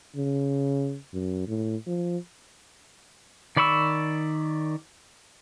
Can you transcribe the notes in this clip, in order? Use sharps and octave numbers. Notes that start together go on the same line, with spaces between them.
C#3
F#2
A2
F3
D#3 D5 B5 C#6 E6